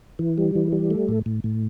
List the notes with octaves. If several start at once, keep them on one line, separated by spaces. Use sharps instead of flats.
E3
G3
E3
G3
A3
A2
A2
A2